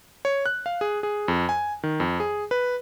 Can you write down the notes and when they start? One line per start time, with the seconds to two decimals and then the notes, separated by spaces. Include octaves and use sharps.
0.25 C#5
0.46 F#6
0.66 F5
0.81 G#4
1.03 G#4
1.28 F2
1.49 G#5
1.83 D#3
2.00 F2
2.20 G#4
2.51 B4